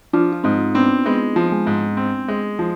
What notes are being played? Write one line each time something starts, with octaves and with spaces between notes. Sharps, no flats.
F3 D4 F4
F4
G#2 C4 D#4
B3 C4 D4
G#3 B3
F3
G#3
G#2
C4
G#3
F3